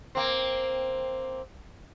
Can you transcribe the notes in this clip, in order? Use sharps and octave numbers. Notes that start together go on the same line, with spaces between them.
A#3 C4